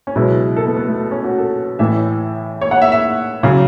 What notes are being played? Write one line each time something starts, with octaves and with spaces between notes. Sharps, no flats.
C#4
C#2 B2 F#3 E4
A4
B3
B3
A3
B3
C#4
F#4
A4
A1 A2 E3 E5
C#5
F#5
E5
E5
C#3 F#3